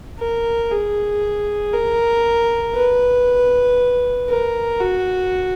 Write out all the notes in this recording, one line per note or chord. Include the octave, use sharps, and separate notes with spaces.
A#4
G#4
A#4
B4
A#4
F#4